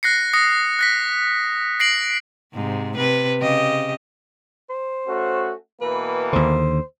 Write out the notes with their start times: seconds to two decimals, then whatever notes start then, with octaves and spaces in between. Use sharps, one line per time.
0.03 F#6 A#6 C7 C#7
0.33 D#6 A#6 C#7
0.79 F#6 A#6 B6
1.80 A#6 C7 D7 F#7
2.54 G#2 C3
2.96 C3 B4
3.40 C#3 G4 D#5
4.69 C5
5.07 A3 C#4 F#4
5.81 B2 E3 A#3 B4
6.33 D#2 D3 C5